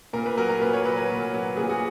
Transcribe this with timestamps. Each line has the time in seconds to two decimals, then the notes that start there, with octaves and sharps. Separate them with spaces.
0.13 A#2 A#4
0.26 B4
0.37 F#3 A#4
0.49 A#4
0.61 A#2 B4
0.73 C#5
0.85 F#3 B4
0.97 A#4
1.10 A#2
1.34 F#3
1.57 A#2 G#4
1.69 F#4